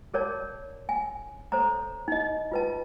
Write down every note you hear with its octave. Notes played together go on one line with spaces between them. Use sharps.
G#4 A#4 C#5 D5 A5
G#5
A4 C5 C#5 A#5
D#4 D#5
F4 B4 A5